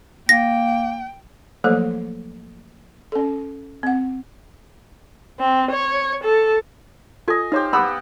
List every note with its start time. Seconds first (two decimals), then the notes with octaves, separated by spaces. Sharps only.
0.29 A#3 G5 A#6
1.64 F3 F#3 A3 A#3 A4 C5
3.12 C#4 A4
3.83 C4 F#5
5.39 C4
5.71 C#5
6.24 A4
7.28 F4 A4 D#5 G#5
7.52 D#4 G4 C5 C#5 F5
7.73 B3 G4 B4 F#5 B5 E6